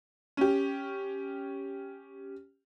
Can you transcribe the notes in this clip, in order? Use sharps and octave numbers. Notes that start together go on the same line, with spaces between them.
C#4 G4